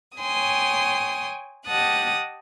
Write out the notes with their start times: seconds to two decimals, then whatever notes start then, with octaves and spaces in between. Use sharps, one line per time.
0.18 C#5 G5 G#5 C6 D#6
1.66 G4 D#5 F#5 A5 D#6 F#6